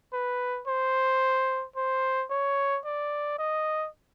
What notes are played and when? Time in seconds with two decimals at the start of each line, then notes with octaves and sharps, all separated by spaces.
0.13 B4
0.67 C5
1.76 C5
2.31 C#5
2.85 D5
3.39 D#5